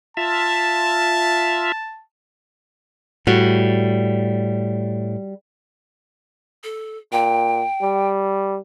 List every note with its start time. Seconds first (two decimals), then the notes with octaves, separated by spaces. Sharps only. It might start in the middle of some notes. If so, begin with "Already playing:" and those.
0.17 F4 E5 A5
3.27 A2 G3 F#4
6.64 A4
7.12 A#2 G5
7.82 G3